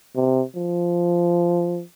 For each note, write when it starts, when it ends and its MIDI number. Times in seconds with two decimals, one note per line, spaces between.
0.16 0.43 48
0.56 1.82 53